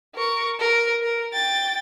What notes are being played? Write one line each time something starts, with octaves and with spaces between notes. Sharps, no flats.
A#4 C#6
A#4
A#4
G5 A6